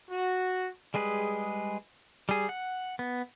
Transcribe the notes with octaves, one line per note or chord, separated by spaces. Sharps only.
F#4
G3 G#3 G#4 B4
G3 G#4
F#5
B3